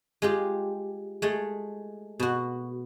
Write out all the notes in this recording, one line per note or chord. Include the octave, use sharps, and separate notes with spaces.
G#3 F4 G4
G#3 A3
B2 F#4